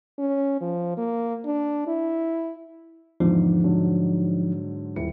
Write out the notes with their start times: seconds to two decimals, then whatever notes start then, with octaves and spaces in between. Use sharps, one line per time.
0.19 C#4
0.61 F3
0.97 A#3
1.46 D4
1.87 E4
3.20 E2 G#2 D3 F3 D#4
3.64 G#2 D3 F#3
4.96 D#1 E4 C#7